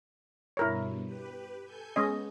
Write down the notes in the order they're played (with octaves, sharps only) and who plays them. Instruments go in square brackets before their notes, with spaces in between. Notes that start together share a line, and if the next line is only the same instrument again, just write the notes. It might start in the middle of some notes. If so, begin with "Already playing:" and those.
[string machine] G2 B2 [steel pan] E4 A#4 C#5
[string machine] G4 B4
A4 G#5 G6
[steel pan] G#3 C#4 D#5 [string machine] B3